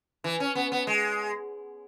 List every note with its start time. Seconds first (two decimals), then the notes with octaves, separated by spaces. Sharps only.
0.24 E3
0.40 C#4
0.55 B3
0.72 B3
0.87 G#3